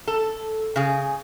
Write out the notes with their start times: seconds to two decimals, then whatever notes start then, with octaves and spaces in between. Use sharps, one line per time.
0.08 A4
0.76 C#3 G#4